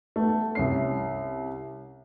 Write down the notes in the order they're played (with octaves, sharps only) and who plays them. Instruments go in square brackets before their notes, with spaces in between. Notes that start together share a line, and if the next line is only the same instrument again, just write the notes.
[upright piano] A3 B3
C2 C#4 C7